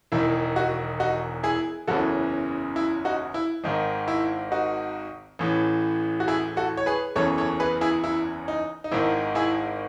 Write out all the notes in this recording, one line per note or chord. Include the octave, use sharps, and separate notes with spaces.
E1 E2 D#3 E4
D#4 F#4
D#4 F#4
E4 G#4
F#1 E2 C#3 E3 F#4 A4
E4
D#4 F#4
E4
G#1 G#2 D#3 D#4
E4
D#4 F#4
A1 A2 E3
F#4
E4 G#4
F#4 A4
C#5
G#4 B4
F#1 E2 C#3 E3 A4 C#5
A4 C#5
G#4 B4
E4 G#4
E4
D#4
D#4
G#1 G#2 D#3 E4
E4 G#4